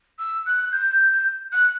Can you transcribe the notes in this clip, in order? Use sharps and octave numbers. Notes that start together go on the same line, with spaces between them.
E6
F#6
G6
F#6